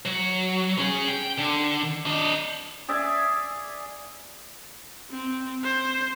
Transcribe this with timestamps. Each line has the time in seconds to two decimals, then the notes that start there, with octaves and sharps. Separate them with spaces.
0.05 F#3
0.78 C#4 G#4
1.08 G5
1.38 D3
2.06 D4 D#5
2.89 G#4 D5 E5 G#5
5.11 C4
5.64 C5